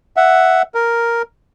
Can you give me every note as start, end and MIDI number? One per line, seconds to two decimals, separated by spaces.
0.17 0.62 76
0.17 0.62 78
0.75 1.22 70